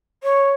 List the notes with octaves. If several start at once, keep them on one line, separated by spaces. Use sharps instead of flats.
C#5